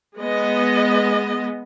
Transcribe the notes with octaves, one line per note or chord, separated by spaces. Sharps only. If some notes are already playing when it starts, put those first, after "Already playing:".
G#3 B3 D#5